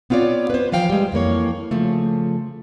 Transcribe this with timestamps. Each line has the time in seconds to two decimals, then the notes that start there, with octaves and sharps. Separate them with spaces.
0.10 B3 C4 F4 C#5 D5
0.50 B4 C5
0.72 E3 F3 F5 G5
0.90 G3 G#3
1.12 F2 E3 A#3 C#5
1.71 C#3 F3 A3